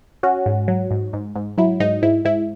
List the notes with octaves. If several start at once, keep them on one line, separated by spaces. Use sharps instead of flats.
C#4 F#4
G#2
F#3
G#2
G#2
G#2
F#3 E4
G#2 D#4
G#2 E4
G#2 E4